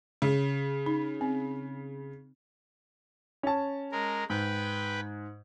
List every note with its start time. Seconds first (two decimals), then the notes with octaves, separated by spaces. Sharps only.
0.22 C#3
0.86 D#4
1.21 C4
3.43 C#4 A5
3.92 G#3 A#4
4.30 G#2 B4 G5 B5